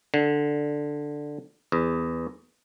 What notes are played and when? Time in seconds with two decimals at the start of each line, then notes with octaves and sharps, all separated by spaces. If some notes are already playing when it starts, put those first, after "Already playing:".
0.14 D3
1.72 E2